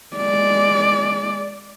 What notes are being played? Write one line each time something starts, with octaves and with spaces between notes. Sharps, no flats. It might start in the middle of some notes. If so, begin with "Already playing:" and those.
G#3 D5